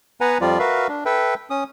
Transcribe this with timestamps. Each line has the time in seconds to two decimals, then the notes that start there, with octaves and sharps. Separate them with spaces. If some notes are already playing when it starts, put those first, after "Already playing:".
0.21 B3 B4 F#5 G#5 A#5
0.41 F2 F3 G3 F4 D5
0.59 F#4 A#4 B4 E5 F5
0.89 D4
1.06 A4 B4 E5 G5
1.50 C#4 D#6